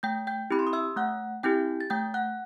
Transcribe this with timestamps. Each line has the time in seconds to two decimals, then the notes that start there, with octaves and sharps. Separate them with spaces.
0.03 A3 G5 G6
0.27 G5 G6
0.50 C4 E4 G4 B5
0.59 C6
0.67 D#6
0.73 E5 E6
0.96 A3 F#5 F#6
1.43 C4 E4 G4 G5 G6
1.81 A6
1.90 A3 G5 G6
2.14 F#5 F#6